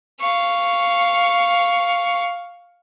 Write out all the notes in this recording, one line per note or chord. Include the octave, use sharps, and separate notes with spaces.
F5 C#6